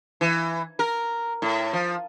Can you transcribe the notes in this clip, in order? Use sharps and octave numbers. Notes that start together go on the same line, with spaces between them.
E3
A#4
A2
F3